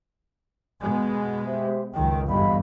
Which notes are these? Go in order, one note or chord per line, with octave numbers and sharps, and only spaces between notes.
B2 G#3 B3 G#5
G4 C5 E5
C#2 F#2 D#3 G5
G1 E2 G2 D#5 F5 B5